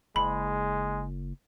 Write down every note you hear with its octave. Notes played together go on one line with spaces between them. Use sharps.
F#1 G#3 B5